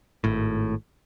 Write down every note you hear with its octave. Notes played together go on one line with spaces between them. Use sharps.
G#1 A2